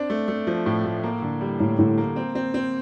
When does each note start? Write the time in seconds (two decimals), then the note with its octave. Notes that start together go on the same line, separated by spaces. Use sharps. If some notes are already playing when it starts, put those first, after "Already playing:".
Already playing: C4 D4
0.10 A3
0.28 A3
0.47 F3
0.66 A2
0.85 A2
1.03 A#3
1.22 D3
1.41 G3
1.60 A2 A#3
1.78 A2 D3
1.98 A#3
2.16 C4
2.35 C4
2.54 C4